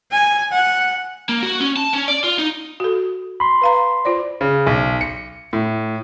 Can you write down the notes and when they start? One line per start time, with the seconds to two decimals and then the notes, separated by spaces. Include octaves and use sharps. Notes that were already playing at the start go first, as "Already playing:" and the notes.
0.11 G#5
0.52 F#5
1.29 A#3
1.43 F#4
1.61 C#4
1.77 A5
1.93 C#4
2.08 D5
2.24 F4
2.38 D#4
2.80 F#4 A4
3.40 B5 C6
3.61 B4 F5 A#5
4.05 F4 C5 D5
4.41 C#3
4.67 B1
5.01 C#7
5.53 A2